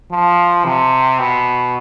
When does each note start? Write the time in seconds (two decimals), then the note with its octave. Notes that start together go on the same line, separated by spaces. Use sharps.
0.11 F3
0.65 C3
1.19 B2